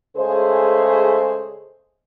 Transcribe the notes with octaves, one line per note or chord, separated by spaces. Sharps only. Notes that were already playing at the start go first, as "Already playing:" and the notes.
C#3 G#3 A3 G#4 C5